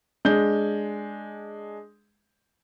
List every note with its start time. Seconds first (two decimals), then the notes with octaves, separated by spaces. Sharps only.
0.25 G#3 D4 G6 G7